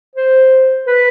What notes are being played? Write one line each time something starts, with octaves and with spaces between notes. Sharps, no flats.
C5
B4